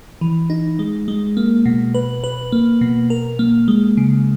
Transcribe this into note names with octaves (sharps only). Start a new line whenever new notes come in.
E3
D#4
G#3
G#3
A#3
B2
B4
B4
A#3
B2
A#4
A#3
G#3
C#3